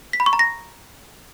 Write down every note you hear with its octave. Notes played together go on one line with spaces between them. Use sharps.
B6
B5
C#6
A#5
A#6